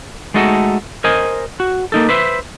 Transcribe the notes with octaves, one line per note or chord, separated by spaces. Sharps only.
G#3 A3 D#4 F#4 A4
A#4 C5 D#5 G#5
F#4
A#3 D#4 A4
B4 C5 E5